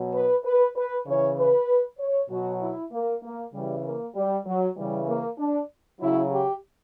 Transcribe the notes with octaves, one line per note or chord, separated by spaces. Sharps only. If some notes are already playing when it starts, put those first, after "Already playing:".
Already playing: B2 F#3
B4
B4
B4
C#3 E3 C#5
B4
C#5
B2 F#3 F#4
E4
A#3
A#3
C#3 E3 G3
A#3
G3
F#3
C#3 E3 G3
A#3
D4
C#3 F#3 E4
G4